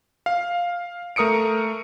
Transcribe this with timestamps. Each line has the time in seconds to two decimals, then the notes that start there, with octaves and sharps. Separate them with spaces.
0.26 F5
1.16 A3 A#4 D#6 C#7 D7